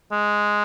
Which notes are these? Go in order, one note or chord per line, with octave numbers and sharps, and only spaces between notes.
G#3